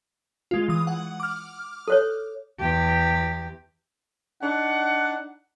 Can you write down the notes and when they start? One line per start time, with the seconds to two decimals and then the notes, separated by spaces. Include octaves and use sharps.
0.51 G#3 F4
0.68 E3 D#6
0.87 F#5
1.20 D6 F6
1.88 A4 C5 C#5
2.60 E2 G4
4.42 D4 D#4 F#5